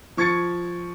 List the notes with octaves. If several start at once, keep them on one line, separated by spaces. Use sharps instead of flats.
F3 C#6 G#6 A6 C#7